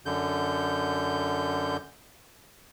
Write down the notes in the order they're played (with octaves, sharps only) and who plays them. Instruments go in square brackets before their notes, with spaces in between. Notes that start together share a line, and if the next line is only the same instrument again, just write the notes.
[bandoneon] F#2 D3 G6